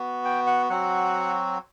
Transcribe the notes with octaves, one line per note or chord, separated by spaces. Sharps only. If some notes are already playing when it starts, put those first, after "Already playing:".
Already playing: B3 F#4
G5
F#5
F#3 C4 F#4 F#5